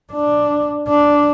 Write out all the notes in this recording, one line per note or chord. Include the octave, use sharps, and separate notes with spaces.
D4
D4